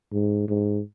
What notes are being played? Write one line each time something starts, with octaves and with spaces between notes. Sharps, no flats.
G#2
G#2